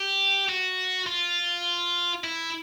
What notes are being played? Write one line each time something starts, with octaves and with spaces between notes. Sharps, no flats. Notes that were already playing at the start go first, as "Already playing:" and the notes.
Already playing: G4
F#4
F4
E4